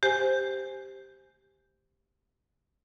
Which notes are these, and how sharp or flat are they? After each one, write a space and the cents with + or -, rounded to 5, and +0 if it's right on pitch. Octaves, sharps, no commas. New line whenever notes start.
G4 +0 C5 +0 G#5 +0